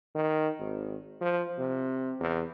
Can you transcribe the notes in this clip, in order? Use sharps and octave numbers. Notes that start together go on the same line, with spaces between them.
D#3
G#1
F3
C3
E2